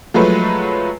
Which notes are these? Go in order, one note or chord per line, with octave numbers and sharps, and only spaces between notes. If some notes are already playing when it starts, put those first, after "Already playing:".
F3 F#3 G#3 A3 B4